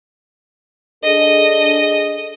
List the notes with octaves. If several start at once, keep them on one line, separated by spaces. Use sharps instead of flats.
D4 G#4 A4 D#5